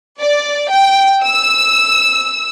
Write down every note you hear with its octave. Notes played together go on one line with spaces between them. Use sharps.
D5
G5
E6